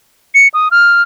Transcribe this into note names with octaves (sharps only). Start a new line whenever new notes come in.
C#7
D#6
F6